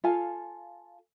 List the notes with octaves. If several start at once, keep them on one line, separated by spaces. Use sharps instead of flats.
F4 A4 F5 G#5